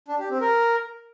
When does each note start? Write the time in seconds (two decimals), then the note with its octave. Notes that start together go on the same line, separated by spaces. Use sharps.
0.08 D4
0.19 G4
0.30 C4
0.41 A#4